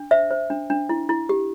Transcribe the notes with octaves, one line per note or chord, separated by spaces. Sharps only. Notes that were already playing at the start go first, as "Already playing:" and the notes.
Already playing: D4
C5 E5
C5
D4
D4
E4
E4
G4